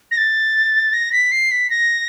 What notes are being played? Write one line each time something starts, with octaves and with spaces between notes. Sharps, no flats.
A#6
A6
A#6
B6
C7
B6
A#6